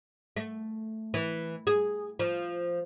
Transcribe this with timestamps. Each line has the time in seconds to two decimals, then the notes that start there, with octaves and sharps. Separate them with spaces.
0.37 A3
1.14 E3
1.67 G#4
2.19 F3